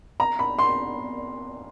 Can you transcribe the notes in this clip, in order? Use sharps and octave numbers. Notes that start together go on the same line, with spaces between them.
A#5
B5
C6